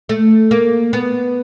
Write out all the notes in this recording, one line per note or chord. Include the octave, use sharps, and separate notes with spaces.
A3
A#3
B3